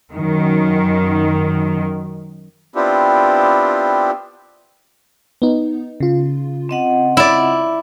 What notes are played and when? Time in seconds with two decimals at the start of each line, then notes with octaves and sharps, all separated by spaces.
0.14 F#2 D#3
2.76 B3 C4 D4 E4 F4 G4
5.42 B3 D#4
6.00 C#3 F4
6.69 C4 D#5 F#5
7.17 E4 D5